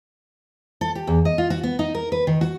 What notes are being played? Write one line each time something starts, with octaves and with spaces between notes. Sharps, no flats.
A4
G4
E2
D#5
F4
F#4
B3
D#4
A#4
B4
D#3
F#4